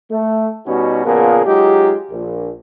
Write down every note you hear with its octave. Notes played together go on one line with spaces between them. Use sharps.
A3
B2 G3 B3 C#4 D#4 F#4
A#2 C#3 F3 B3 G#4 A#4
F#3 G#3 D#4 F4 G4
A#1